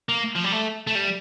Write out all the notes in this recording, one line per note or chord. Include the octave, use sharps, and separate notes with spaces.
A#3
F3
G3
A3
A3
G3